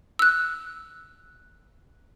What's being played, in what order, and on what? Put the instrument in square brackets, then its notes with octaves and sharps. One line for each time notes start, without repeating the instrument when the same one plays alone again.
[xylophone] E6 F#6